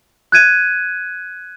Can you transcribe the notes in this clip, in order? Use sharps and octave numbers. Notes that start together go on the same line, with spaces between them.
F#6 G#6 D#7